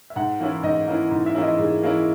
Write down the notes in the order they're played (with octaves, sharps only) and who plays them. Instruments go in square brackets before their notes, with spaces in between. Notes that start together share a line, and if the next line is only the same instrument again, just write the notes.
[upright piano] E5
[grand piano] G#2 [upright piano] F#5
[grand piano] E3 A#3 C#4 E4
[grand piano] G#2 [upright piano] D#5
[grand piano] E3 A#3 C#4 E4
G#2
[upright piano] E5
[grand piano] E3 A#3 C#4 E4
[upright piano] D#5
[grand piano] G#2 [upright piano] G#4
[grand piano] E3 A#3 C#4 E4